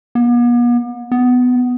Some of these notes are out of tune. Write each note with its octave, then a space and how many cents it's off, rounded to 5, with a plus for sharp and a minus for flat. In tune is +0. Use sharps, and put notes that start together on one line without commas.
B3 -45
B3 +15